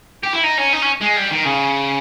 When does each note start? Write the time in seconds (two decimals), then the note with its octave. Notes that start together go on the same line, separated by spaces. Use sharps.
0.23 G4
0.33 E4
0.44 D#4
0.58 C#4
0.73 D#4
0.83 C#4
1.01 G#3
1.17 G3
1.32 D#3
1.46 C#3